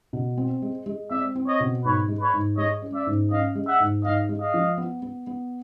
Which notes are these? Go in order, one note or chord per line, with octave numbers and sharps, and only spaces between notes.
B2
C4
G#3
G#3
C4 D5 E5
C4
C#5 D#5
B2
G#2 B4 C#5
G#3
B4 C#5
G#2
G#3 C#5 D#5
C#4
D5 E5
G#2
C#4 D#5 F5
G#3
E5 F#5
G#2
G#2 D#5 F5
G#3
D#5 F5
F3
B3
B3
B3